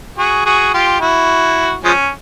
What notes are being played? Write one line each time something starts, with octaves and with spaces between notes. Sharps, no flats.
F#4 G#4
F#4 G#4
F4 G4
E4 F#4
F3 G#3 C#4